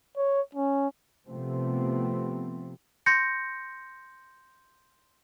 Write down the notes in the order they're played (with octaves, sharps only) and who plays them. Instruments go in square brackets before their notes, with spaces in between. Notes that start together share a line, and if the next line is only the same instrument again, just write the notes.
[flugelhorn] C#5
C#4
[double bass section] C3 F3 A3 B3 C4
[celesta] C6 G6 A#6 C#7